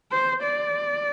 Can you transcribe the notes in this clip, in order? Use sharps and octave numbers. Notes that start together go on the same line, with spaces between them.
C5
D5